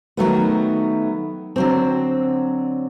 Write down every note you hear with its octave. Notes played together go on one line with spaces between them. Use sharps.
D#3 F#3 A3 B3
D3 F#3 C4